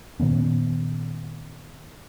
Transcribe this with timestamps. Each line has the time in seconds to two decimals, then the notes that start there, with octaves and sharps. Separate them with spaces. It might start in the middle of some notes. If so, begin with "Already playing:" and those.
0.20 A#2 D#3 B3 C#4